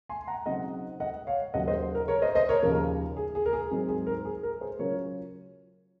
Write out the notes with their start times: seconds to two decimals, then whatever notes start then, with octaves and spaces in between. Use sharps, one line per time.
0.09 G#5 C6
0.27 F#5 A#5
0.46 C#3 F#3 C4 D#4 D#5 F#5
1.00 D#5 F#5
1.27 C#5 F5
1.54 D#2 C#3 F#3 A#3 D#5 F#5
1.68 C5 D#5
1.95 A#4
2.08 A#4 C#5
2.22 C5 D#5
2.35 C5 D#5
2.49 A#4 C#5
2.62 D#2 C#3 F3 A#4
3.17 G#4
3.35 G#4
3.46 A#4
3.53 G#4
3.71 G#2 F#3 C4 D#4 G#4
3.89 G#4
4.07 A#4
4.25 G#4
4.43 A#4
4.61 G#4 C5
4.79 C#3 F#3 C#4 F4 A#4 C#5